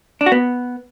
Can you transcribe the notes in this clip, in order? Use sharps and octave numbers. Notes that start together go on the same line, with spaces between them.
D4
F#4
B3